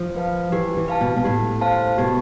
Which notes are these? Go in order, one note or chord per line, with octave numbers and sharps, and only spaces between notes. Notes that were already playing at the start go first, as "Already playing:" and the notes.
Already playing: F3
B4 F5 A5
E3 G4
E3
B4 F5 A5
B2
B2
A2 G4
C5 F5 A5
B2 G4